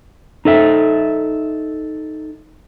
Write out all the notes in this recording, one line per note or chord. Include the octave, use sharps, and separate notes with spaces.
D#4 A4 E5